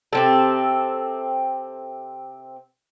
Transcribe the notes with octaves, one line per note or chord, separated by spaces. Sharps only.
C3 C4 A4